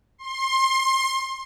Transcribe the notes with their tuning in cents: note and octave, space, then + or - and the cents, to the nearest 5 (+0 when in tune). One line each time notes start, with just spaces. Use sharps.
C6 +25